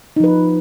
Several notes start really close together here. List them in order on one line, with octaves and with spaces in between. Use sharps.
D#4 F3 B4